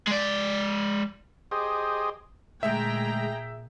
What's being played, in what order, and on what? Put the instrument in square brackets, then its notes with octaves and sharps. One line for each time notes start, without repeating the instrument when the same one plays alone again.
[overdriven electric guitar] G#3 D5
[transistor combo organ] G4 G#4 C5 D#5
[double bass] A#2 [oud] D3 G#3 A3 [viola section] G#4 G5 A#5 [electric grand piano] E5